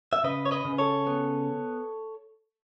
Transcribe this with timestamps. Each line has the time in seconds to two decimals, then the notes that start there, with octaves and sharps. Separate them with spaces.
0.13 E5
0.24 C#3 B4 D#5
0.45 C#5
0.51 B4 D#5
0.65 C#3
0.78 A4 C#5
1.07 B3